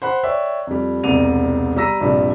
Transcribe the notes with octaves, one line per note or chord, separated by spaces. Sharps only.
C5 F#5 B5 F#6
C#5 D5 E5 G5
F2 G3
E1 C2 C3 D5 D#7 F7
G3 A#5 E6 A#6 B6 D#7
A#1 G2 C3 G3